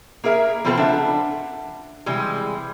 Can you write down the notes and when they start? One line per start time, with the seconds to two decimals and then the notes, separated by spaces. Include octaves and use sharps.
0.24 A#3 G#4 A#4 E5
0.65 B2 F3 B3 C4 F4 A4
0.77 D4 E5 F#5
2.06 C3 E3 G3 G#3